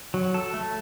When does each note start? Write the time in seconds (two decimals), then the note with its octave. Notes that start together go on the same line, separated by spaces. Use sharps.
0.14 F#3
0.34 A4
0.54 A3